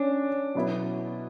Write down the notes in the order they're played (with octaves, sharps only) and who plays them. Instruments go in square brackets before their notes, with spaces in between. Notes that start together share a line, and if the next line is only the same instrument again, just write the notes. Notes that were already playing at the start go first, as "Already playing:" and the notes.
Already playing: [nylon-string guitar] C#4 [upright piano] D4
[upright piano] B2 F#3 B3 E4